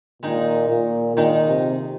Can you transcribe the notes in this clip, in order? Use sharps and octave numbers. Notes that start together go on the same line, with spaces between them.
A#2 D#3 G#3 D#4
A#2
A#2 D#3 G#3 D#4
C3